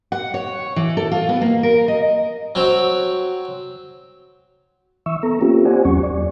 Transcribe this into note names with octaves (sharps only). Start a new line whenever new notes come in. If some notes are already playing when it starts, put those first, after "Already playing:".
F#5
C#5
E3
A4
F4
B3
A#3
A#4
D#5
F#3 C4
E3 E5 C#6 E6
B3 A4 A#5
A#3 C4 C#4 F4 G4
G4 C5 D5 F#5 G#5
E2 F#3 C#4 C#6
D5